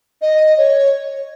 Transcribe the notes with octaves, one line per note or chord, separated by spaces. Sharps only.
D#5
C#5